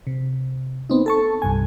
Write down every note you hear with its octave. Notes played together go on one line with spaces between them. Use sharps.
C3
B3 C4 D#4
A4 A5 C#6
C2 G2 G#5